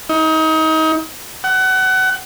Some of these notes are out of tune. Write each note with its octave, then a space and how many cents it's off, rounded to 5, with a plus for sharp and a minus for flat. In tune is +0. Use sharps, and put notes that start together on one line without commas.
D#4 +30
F#5 +25